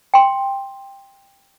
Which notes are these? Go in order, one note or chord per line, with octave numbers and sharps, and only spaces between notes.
G5 C6